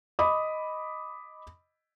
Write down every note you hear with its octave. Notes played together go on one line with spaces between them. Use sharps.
D#5 B5 D6 D#6